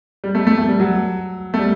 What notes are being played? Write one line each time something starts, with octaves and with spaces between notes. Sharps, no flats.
G3
A3
A3
A3
G3
F#3
A3
G3